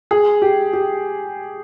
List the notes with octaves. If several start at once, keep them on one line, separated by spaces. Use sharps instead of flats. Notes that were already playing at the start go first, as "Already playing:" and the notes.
G#4
G4
G4